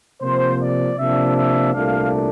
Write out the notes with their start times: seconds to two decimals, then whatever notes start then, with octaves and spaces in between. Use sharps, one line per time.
0.21 C3 F3 A#3 C5
0.59 D5
0.97 C3 F3 A#3 D4 E5
1.35 E5
1.72 C2 A#2 A3 D4 F5